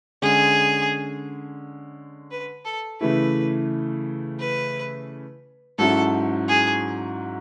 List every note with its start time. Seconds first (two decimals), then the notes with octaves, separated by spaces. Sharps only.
0.22 D3 G#3 C#4 G#4
2.31 B4
2.65 A4
3.01 C#3 E3 A3 E4 B4
4.40 B4
5.78 G#2 F#3 C#4 E4 A4
6.48 G#4